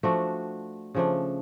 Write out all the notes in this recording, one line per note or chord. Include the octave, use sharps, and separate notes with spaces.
F3 A3 D4 F#4
C#3 F3 A3 D4